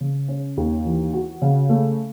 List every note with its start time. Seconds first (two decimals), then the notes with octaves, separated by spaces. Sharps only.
0.01 C#3
0.28 C#4
0.57 D#2
0.85 E3
1.14 F#4
1.42 C#3
1.69 A3